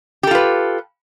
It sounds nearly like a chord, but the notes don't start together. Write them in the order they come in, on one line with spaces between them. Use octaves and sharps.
G4 A4 F4 B4